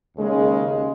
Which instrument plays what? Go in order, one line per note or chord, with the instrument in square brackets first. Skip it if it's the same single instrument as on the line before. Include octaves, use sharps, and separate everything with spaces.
[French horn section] D#2 C#3 G#3